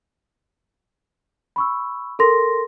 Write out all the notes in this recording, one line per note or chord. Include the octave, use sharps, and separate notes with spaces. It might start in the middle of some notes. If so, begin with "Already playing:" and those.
B5 C#6 E6
A4 A#4 C6 A#6